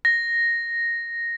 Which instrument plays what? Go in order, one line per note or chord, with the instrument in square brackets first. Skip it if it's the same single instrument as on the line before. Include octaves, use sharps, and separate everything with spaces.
[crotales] A#6